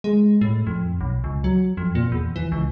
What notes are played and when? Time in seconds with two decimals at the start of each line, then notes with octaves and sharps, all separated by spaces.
0.04 G#3
0.41 A2
0.67 F2
1.01 B1
1.24 C#2
1.44 F#3
1.77 F2
1.95 A#2
2.12 E2
2.36 E3
2.52 C#2